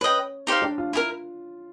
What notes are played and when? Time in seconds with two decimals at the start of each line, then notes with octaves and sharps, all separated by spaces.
0.01 C#4 B4 D#5 G5
0.47 D#4 G4 C5 F5
0.62 D4
0.78 F4
0.93 E4 F4 G4 A#4